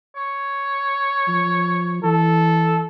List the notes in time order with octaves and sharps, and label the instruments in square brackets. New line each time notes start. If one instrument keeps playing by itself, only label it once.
[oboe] C#5
[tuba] F3
[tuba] E3 [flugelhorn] A4